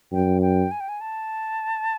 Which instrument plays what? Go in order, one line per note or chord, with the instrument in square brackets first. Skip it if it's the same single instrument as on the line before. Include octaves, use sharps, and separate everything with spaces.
[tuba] F#2 [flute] G5
[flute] G5
G#5
G5
G#5
A5